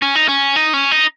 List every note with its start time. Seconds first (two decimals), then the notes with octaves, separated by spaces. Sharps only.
0.02 C#4
0.15 D#4
0.28 C#4
0.56 D#4
0.73 C#4
0.91 D#4